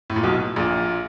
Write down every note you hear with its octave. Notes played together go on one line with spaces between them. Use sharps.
A2
A#2
B1 B2
A#1 A#2